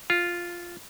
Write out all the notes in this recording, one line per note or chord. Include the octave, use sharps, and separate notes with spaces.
F4